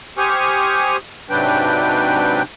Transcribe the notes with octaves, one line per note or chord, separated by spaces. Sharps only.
G4 C5 G#5 C#6 D#6 F6
G#2 C3 F#3 D4 B4 G5